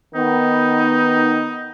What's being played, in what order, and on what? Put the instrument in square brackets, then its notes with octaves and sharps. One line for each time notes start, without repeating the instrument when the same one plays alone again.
[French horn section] D#3 B3 [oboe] D#4